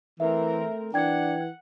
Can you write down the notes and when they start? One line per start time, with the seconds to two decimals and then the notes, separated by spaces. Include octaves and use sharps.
0.20 E3 A3 C4 A#4 E5
0.94 E3 D4 F#5 G5 G#6